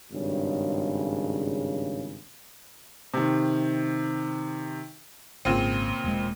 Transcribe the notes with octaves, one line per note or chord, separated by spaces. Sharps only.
G#1 G2 C#3
C3 D#3
G#1 A#2 C#3 C4
E1 G#3